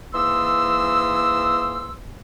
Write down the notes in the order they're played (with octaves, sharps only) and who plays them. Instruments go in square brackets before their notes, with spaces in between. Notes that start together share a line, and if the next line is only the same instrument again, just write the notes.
[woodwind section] G#2 E3 A#3 C6 D#6 E6